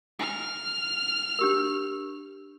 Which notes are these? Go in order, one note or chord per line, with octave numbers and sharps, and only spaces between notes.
G#5 F6
D4 G4 A#4